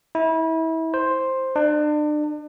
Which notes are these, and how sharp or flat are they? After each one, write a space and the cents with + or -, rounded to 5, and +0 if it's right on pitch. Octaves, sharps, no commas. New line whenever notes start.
E4 -30
C5 +5
D4 +35